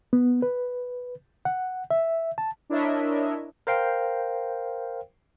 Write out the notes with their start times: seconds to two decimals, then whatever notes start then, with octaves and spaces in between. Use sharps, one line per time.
0.13 B3
0.42 B4
1.45 F#5
1.91 E5
2.38 A5
2.70 D4 E4 A#4 C#5 D#5 E5
3.67 A#4 C5 F5 G5